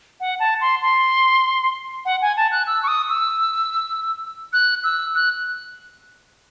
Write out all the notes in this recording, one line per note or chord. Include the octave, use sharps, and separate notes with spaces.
F#5
A5
C6
C6
F#5
G#5
A5
F#6
E6
C#6
D#6
E6
F#6
E6
F#6